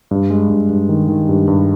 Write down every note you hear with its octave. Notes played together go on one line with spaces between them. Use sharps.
G2
G#3
G2
G2
D#3
D#3
G2
G2